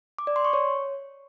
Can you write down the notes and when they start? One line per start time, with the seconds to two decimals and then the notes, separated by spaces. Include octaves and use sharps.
0.18 D6
0.27 D5
0.36 C6
0.45 C#6
0.53 C#5